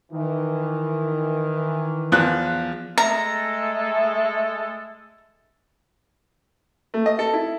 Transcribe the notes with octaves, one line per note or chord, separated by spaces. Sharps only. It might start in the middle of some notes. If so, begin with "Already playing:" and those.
D#3 E3
E2 F3 F#6
G#3 A3 A4 A#5
A3
D#5
A4
E4